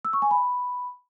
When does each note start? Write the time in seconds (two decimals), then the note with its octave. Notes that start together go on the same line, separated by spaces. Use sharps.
0.05 E6
0.13 C#6
0.22 G#5
0.31 B5